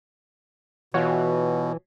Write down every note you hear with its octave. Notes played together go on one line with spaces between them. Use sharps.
B2 E3 F4 F#4 C#5